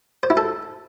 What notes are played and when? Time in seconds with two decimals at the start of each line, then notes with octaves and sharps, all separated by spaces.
0.23 C5
0.30 E4
0.37 A4